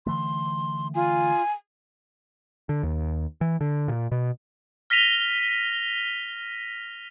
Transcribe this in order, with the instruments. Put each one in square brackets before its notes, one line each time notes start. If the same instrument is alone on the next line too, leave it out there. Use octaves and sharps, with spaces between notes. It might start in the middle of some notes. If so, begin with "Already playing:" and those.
[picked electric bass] D3 E3 A3 [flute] C6
[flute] F4 [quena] G#5
[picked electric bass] D3
D#2
E3
D3
A#2
B2
[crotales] F6 A#6 B6 D#7 F7 G7